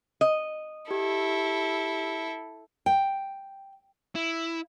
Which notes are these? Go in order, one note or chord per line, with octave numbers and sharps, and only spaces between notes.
D#5
E4 G4 A4
G5
E4